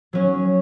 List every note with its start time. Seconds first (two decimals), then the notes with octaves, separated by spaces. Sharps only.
0.13 F#3 C#4